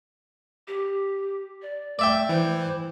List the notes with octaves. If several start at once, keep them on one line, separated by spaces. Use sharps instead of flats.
G4
D5
A3 D5 E5 G5
E3 C5